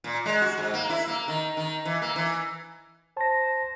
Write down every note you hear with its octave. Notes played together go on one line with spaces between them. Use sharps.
A#2
G#3
F#4
G#2
A#3
E4
A#3
D#3
D#3
E3
A#3
E3
C5 A5 A#6